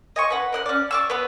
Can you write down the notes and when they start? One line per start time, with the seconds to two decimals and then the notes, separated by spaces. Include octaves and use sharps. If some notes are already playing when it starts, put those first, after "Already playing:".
0.16 D#5 G#5 C#6
0.30 B4 F#5
0.52 A#4 D#5 F#5
0.66 C#4 D5
0.91 D5 C#6 E6
1.10 B3 B4